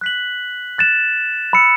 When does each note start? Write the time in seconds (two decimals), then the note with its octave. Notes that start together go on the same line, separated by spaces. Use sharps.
0.01 F#6 B6 F#7
0.78 F#6 A6 E7
1.53 B5 E6 C#7